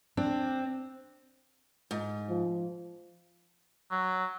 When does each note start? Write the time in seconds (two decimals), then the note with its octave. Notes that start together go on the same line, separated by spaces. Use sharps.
0.17 C4 D4
1.91 G#2
2.29 F3
3.91 F#3